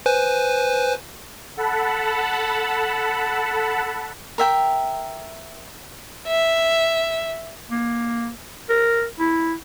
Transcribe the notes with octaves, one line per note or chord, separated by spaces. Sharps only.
B4 C5 G#5
A4 F#5 A5 B5
A#4 E5 G5
E5
A#3
A#4
E4